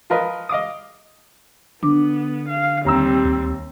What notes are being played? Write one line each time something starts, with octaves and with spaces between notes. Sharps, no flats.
F3 F4 A#4 B4 D#5
D#5 F5 D6 D#6
D3 B3 D4 D6
F5
D#2 G3 C4 A#5 E6
D2